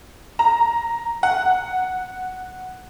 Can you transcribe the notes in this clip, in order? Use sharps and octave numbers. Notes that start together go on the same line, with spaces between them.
A#5
F#5